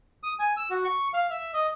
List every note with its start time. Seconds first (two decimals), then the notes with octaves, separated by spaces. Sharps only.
0.23 D#6
0.39 G#5
0.57 E6
0.70 F#4
0.85 C#6
1.14 F5
1.30 E5
1.54 D#5